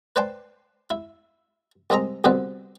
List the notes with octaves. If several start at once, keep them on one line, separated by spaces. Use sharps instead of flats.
B4 C5 D5 G5 A5 C6
E4
C2 G#3 C4 D#5 A#5
C2 B2 D3 C4 B4